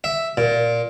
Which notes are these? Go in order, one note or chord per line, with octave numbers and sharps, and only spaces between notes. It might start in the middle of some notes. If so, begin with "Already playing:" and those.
E5
A#2